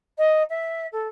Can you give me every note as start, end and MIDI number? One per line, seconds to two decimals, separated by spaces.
0.18 0.43 75
0.50 0.87 76
0.92 1.08 69